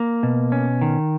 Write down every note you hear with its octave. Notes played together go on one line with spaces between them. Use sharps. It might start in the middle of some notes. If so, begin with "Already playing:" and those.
Already playing: A#3
B2
C#4
D#3